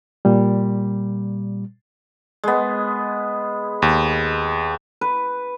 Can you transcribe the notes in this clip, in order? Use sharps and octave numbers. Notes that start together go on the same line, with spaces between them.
A#2 G3
G#3 B3
D#2
B4